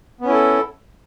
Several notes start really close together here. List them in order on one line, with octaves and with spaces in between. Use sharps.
B3 C#4 E4 A4